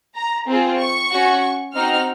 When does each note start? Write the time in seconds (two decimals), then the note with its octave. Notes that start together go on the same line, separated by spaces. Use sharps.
0.16 A#5
0.47 C4 F4 G#4
0.79 C#6
1.11 C#4 F#4
1.74 C4 D#4 F#4 F6